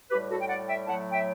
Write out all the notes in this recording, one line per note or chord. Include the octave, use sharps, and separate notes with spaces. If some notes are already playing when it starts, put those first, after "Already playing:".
A2 G3 G4 B4
F#4 A4
G5
D5 F#5
E5 G5
A2 F#3 A3 F#5 A5
E5 G5